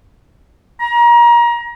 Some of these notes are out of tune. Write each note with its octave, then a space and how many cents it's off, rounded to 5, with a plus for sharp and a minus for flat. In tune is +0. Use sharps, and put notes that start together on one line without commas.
A#5 +30